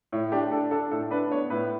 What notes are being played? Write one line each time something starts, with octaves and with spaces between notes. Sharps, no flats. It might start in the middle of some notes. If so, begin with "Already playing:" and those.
A2 C#5
D4 G4
D4 A4
D4 A4
A2 A4
D4 B4
B3 C#5
A2 B4